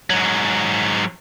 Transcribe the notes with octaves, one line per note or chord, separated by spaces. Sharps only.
G#2 F#3